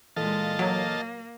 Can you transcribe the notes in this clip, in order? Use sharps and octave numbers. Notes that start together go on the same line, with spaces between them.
A#2 E3 G#3 A4 D#5 F5 A5
F#3 A#3